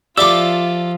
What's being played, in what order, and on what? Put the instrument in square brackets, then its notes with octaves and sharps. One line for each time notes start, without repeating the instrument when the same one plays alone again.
[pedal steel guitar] F3 E5 E6 [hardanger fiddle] F4 [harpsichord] G4 A4 [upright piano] D5 D6